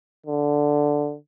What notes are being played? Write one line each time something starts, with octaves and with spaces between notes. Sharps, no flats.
D3